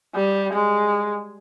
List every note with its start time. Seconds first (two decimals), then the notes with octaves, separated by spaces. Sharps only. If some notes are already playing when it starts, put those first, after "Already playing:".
0.15 G3
0.53 G#3